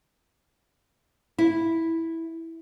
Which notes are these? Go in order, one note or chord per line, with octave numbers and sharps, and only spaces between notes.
E4